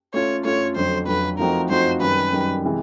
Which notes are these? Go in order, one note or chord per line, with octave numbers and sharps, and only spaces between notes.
A3 C#4 F4 C#5
A3 C#4 F4 C#5
F2 D3 F#3 C5
F2 D3 F#3 B4
F3 A3 C4 D#4 F#4 A#4
F3 A3 C4 D#4 F#4 C5
F#2 D#3 G3 B4
F#2 D#3 G3
C3 E3 G#3